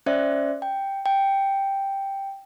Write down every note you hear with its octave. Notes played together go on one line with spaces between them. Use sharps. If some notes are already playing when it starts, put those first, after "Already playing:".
C#4 C5 D5 E5
G5
G5